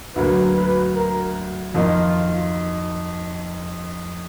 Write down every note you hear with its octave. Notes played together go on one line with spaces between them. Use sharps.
D2 D3 F#3 A#3 B4
B4
A#4
F2 D#3 A#3 D#4 F4